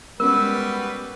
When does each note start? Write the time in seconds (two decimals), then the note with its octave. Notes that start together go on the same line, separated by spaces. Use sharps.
0.20 G3 G#3 B3 C#4 F#4 A#4 B4